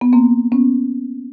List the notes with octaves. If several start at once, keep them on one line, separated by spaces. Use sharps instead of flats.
B3
A#3 C4
B3 C#4